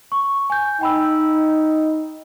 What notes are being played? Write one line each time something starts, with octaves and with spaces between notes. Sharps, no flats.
C#6
G#5 G6
D#4 G5 B5 E6